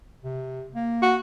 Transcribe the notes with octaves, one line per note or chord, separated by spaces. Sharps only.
C3
A#3
F#4